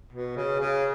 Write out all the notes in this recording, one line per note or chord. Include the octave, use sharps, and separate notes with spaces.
B2
C#3
C#3